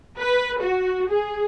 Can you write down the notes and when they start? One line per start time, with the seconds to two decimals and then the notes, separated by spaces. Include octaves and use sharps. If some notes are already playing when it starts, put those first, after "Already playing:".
0.19 B4
0.61 F#4
1.10 G#4